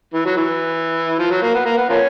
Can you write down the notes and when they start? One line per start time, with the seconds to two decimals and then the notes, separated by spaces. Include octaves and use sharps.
0.13 E3
0.25 F#3
0.36 E3
1.19 F3
1.30 F#3
1.42 A#3
1.54 B3
1.65 A#3
1.77 B3
1.89 F3 A#3 C#4